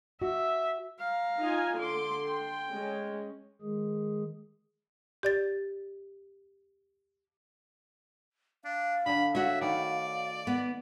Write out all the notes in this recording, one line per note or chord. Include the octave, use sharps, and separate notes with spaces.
F#4 E5
F5 A#5
D#4 F4 G#5
D3 C6 D6
G5
G#3 C#4
D#3 G#3 G#4
G4 D5 A6
D4 F5
D3 D4 B5
F#4 C#5 E5
D#3 A3 B4 D5
B3